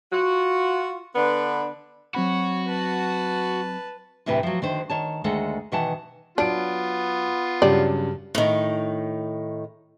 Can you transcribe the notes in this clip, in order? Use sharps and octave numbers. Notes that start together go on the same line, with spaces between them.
F4 F#4
D3 B3 D4 B4
F#3 C4 F#4 C#5 B5
B4 A5
D2 A2 C3 E3 B4
F3 F#3
D3 D#3 C5
D#3 C#5 A5
D2 D#3 G#3 A4 F#5
B2 D#3 E3 F#5 A5
F#3 B3 D4 F4 D7
G2 C#3 F#3 G3 D5
A2 D#3